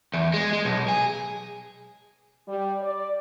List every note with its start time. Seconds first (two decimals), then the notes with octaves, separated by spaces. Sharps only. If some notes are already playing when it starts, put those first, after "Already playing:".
0.14 E2
0.34 G#3
0.53 G#3
0.65 B1
0.88 G#4
2.48 G3
2.82 D5